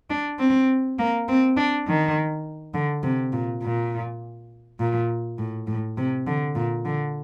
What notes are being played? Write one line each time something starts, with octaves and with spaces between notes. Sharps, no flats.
D4
C4
A#3
C4
D4
D#3
D3
C3
A#2
A#2
A#2
A2
A2
C3
D3
A#2
D3